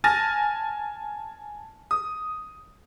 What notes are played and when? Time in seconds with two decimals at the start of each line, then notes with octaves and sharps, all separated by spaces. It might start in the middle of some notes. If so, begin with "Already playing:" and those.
0.04 G#5 A5 F6 A6 A#6
1.91 D#6